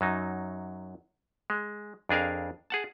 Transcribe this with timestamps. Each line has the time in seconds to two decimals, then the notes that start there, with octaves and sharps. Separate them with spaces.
0.01 F#2 F#3 D#4
1.50 G#3
2.09 F2 D4 G#4 A#4 F5
2.70 G#4 F#5 A5